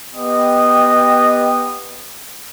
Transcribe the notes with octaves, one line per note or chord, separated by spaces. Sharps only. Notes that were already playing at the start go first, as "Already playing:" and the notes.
B3 G4 D#5 G5 D#6